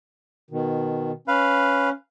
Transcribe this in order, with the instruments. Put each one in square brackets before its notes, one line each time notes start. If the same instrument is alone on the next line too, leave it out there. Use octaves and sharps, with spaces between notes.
[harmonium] B2 D#3
[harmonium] C#4 [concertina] B4 F5